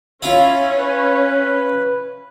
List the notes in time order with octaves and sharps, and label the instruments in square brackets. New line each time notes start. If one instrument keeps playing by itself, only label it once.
[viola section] C#4 [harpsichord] E4 F4
[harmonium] B4